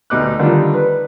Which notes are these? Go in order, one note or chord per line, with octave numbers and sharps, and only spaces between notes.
D2 B2 D#4 D6 F#6
D3 D#3 G3 F4
B4